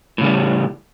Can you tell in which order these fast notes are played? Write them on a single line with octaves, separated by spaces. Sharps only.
A2 C#3 G3